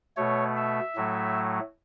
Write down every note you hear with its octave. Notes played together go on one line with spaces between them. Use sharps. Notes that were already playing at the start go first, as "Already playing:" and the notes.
B2 A3 C#5
E5
A2 F#3 A3